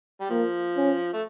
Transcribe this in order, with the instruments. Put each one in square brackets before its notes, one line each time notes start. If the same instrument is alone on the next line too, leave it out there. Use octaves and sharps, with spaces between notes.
[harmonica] G3
[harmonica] F3 [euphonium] A#3
[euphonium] C#4
[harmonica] A3